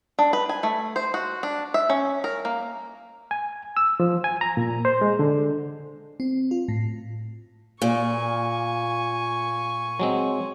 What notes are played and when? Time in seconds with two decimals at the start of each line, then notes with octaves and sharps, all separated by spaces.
0.19 D4
0.33 B4
0.49 G#5
0.63 A3
0.96 C5
1.14 F#4
1.43 D4
1.74 E5
1.90 C#4
2.24 A#4
2.45 A#3
3.31 G#5
3.77 E6
4.00 F3
4.24 G#5
4.41 A#5
4.57 A#2
4.85 C5
5.01 G#3
5.19 D3
6.20 C4
6.51 F4
6.68 A2
7.82 A#2 G#5 C#6
10.00 F#3 G#3 C4